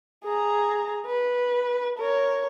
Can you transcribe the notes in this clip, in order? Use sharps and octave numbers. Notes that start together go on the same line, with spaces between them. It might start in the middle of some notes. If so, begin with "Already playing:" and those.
G#4 A#5
B4
A#4 C#5